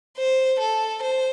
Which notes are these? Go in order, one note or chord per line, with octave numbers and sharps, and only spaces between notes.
C5
A4
C5